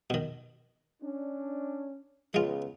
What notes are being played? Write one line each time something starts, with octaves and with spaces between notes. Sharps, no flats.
B2 D#3
C#4 D4
C#2 C#3 G#3 B3 F4